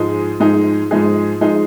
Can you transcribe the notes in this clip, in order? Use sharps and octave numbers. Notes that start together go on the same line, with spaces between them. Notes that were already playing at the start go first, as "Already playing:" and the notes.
Already playing: G#2 F3 G#3 D#4 G#4
G#2 F3 G#3 D#4 G#4
G#2 F3 G#3 D#4 G#4
F3 G#3 D#4 G#4